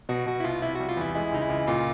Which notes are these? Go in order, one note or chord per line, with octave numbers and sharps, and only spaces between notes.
B2 F#4
B2 F#4
E4
C2 F4
C3 E4
G3 F#4
F4
E2 E4
G#3 E4
C#2 D#4
E4
C#2
A#2 F4